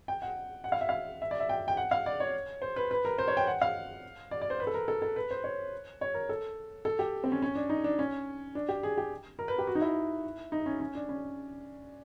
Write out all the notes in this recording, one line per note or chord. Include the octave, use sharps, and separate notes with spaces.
G5
F#5
F#5
F5
E5
F5
E5
D5
E5
G5
G5
F#5
F5
D5
C#5
C5
B4
B4
A#4
C5
C#5
G5
F#5
F5
D5
D5
C5
B4
A4
A#4
A4
A4
B4
C5
C#5
C#5
A#4
A4
A4
G4
C4
C#4
C#4
D4
D#4
D4
C#4
D4
G4
G#4
G4
A#4
B4
G4
F#4
D#4
E4
D#4
C#4
C#4
D4
C#4